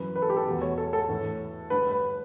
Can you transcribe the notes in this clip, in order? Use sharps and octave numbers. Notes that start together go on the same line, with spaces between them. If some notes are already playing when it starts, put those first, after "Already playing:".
Already playing: F#2 E3 B4
B4
A4
G4
A4
E2 B2
C#5
A4
A4
A2 E3
G2 D3 B4
B4